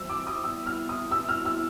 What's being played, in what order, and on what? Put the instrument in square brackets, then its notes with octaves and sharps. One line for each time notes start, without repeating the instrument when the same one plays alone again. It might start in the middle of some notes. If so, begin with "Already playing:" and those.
Already playing: [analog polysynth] E3 G3 C4 [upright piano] E6
[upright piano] D6
D#6
[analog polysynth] G3 B3 E4 [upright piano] E6
[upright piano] F6
D#6
E6
F6
E6